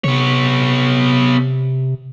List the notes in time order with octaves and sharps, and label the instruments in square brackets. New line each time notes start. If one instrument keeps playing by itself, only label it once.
[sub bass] C3 [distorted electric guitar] B3 C#5